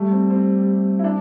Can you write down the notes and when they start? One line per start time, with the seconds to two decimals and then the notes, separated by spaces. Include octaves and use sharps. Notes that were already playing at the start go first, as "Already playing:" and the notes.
Already playing: G3 A3
0.11 C4
0.30 C4
0.99 E4
1.04 D4